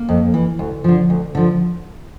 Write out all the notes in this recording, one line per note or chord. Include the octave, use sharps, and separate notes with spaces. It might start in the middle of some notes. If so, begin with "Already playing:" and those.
Already playing: A#3
F2
E3
D2
D3 F3
D2
D3 F3